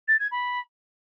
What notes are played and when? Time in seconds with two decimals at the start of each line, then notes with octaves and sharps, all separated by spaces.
0.07 A6
0.19 G#6
0.31 B5